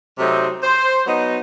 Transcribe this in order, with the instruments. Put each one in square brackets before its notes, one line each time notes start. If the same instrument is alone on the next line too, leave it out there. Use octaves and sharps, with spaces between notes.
[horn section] C3 F#3 A3 C4 D#4
C5
F#3 B3 D#4